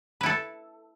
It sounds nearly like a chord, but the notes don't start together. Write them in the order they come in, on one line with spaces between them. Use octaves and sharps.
B4 E4 A4